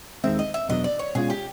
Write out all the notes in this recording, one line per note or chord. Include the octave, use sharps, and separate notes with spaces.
D#2 D#3 G#3 C4 E5
D#5
E5
E2 B2 F#3 B3 D4 D#5
D5
C#5
B2 G#3 C#4 F4 G#4
G4